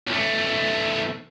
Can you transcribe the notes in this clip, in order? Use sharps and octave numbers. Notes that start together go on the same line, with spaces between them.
B1 A3